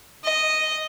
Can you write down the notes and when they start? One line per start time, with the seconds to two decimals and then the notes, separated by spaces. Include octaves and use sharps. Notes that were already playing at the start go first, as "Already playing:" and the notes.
0.24 D#5